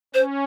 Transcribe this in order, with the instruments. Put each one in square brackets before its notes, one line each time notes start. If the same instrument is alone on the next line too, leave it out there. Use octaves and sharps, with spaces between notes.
[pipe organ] C#4 [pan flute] C5